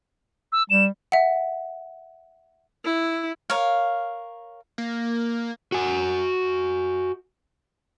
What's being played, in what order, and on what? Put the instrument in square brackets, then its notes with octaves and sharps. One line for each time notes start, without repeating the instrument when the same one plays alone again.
[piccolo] E6
[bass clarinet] G3 [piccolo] E7
[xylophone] E5 F#5
[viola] E4
[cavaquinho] A#4 C#5 F5
[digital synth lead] A#3
[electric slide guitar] F#4 G#5